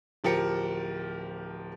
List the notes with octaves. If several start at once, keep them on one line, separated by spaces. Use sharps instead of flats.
D1 F3 G4 A#4 C#7